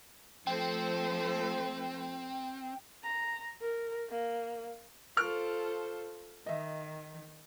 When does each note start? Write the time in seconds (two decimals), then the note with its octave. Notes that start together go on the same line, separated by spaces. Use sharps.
0.47 F3 A3 C4 A4 C5 G5
3.04 A#5
3.61 A#4
4.10 A#3
5.17 F4 A4 C5 C#6 F6 D7
6.46 D#3 D#5 E5